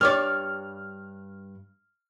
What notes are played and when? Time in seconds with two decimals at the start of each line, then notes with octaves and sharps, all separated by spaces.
0.01 G2 C#5 D5 F6